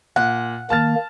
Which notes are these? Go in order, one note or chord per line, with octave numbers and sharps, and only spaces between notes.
A#2 F#5
D#3 A#3 A5 F6 A6